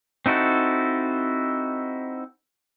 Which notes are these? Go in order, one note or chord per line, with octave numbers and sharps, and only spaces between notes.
C4 D#4 E4 F#4 A4